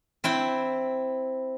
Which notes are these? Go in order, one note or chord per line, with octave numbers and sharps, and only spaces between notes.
C4 E4 G5